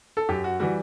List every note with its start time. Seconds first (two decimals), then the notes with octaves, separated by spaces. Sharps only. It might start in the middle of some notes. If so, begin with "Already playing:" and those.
0.17 A4
0.29 F#2 G4
0.44 F#4
0.60 E3 G3 F#4